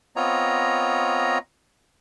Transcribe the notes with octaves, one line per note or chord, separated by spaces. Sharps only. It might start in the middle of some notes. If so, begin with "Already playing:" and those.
B3 C4 F4 C#5 D#5 A#5